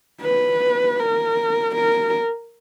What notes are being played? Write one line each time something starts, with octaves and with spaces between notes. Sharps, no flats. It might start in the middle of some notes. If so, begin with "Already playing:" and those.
B4
A#4
A#4